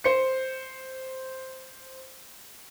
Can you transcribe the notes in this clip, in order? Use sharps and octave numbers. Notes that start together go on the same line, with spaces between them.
C5 C#7